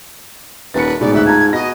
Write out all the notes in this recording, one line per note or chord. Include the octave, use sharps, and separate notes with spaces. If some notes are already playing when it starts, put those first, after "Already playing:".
D#1 B4 A6 C#7
A1 G#2 B2 D5
D2 E5 F#6
F4 A5 A#5 G#6
B2 D#5 A#6